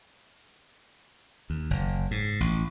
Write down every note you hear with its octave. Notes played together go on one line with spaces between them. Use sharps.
D#2
F#1
G#2
A1